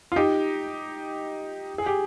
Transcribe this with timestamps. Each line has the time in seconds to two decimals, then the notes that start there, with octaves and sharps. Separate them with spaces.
0.12 F4
0.16 D#4 G4
1.78 G#4
1.86 G4